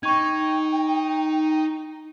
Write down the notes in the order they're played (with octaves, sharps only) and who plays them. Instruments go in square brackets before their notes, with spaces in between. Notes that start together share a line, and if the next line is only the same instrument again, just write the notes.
[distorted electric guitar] D#4 [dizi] G5 [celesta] C#6 G#6